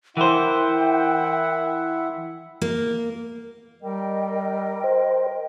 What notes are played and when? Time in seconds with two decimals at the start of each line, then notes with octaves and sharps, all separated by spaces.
0.17 E3 E4 A#4 C5 E5 F#5 G5
2.62 A#3
3.82 G3 A#4 D#5 G5
4.84 C5